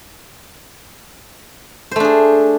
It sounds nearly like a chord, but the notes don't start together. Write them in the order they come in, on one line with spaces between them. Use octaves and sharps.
C5 A3 D4 G#4